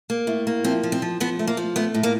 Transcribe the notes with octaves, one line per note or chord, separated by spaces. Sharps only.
A#3
A2
A#3
F3 C4
F3
C4
F3
F3 B3
A3
A#3
F3
A3 B3
A2
A#3